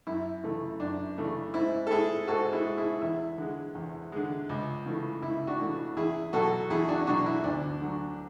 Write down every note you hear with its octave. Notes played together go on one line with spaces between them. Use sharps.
F#2 E4
C#3 E3 A3
F#2 D4
C#3 E3 A3
G#2 E4
A4
G#3 E4 G#4
G#2 F#4 A4
E4 G#4
G#3
E4 G#4
E2 E4
D3 G#3
E2
D3 G#3
C#2
C#3 E3 A3
C#2 E4
D4 F#4
C#3 E3 A3
E2 E4 G#4
B2 F#3 F#4 A4
E2 E4 G#4
D4 F#4
B2 F#3 D4 F#4
E4
D2 D4
D3 F#3